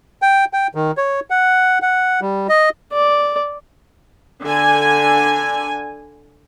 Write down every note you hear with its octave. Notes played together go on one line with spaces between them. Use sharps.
G5
G5
D#3
C#5
F#5
F#5
G3
D#5
D5
D3 G#5